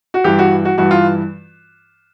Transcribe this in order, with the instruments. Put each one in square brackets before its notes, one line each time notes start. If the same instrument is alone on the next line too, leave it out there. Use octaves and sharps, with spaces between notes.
[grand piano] F#4
G2 E3 G4
F#4
F#4
G2 E3 F#4
F4